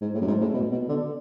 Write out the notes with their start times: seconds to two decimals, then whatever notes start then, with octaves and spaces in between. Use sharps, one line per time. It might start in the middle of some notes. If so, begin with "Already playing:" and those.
0.01 G#2
0.15 A2
0.21 F#2
0.28 G#2
0.41 A2
0.54 B2
0.72 B2
0.89 D3